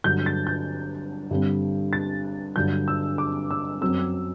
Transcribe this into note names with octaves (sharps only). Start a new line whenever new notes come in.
G2 D3 F#3 G6
A6
G6
G2 D3 G3 C4
A6
G2 D3 F#3 G6
E6
D6
E6
F#2 F#3 C4 E6